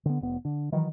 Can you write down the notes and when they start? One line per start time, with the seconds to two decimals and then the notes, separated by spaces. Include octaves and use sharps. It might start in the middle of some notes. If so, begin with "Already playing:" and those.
0.05 D3 B3
0.21 F1 B3
0.45 D3
0.72 D#3 E3 F#3